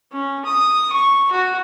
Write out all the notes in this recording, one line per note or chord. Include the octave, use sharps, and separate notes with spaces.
C#4
D#6
C#6
F#4